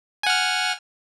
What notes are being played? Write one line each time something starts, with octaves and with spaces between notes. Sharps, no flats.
F#5 G#5 F6